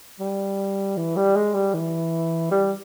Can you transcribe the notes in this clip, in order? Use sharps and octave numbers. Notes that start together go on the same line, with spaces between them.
G3
E3
G3
G#3
G3
E3
G3